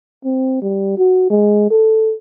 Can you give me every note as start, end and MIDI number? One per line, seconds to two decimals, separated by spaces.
0.25 0.59 60
0.62 0.95 55
0.98 1.26 66
1.30 1.66 56
1.71 2.14 69